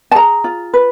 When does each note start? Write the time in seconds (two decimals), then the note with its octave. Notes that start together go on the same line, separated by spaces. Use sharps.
0.11 A5
0.15 G#4 A#5
0.44 F4
0.74 B4